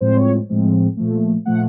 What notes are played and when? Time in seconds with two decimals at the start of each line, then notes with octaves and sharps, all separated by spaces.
0.01 A2 F3 G#3 C4 C5
0.16 C#5
0.49 A2 F3 G#3 C4
0.97 A#2 F3 A3
1.45 A#2 F3 A3 F#5